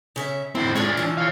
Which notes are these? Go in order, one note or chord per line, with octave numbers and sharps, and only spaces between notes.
C#3 C#4 E5
A2 C4 E4
G#2 F3 G#3 D4 C#5
E3 F3
C#5 F5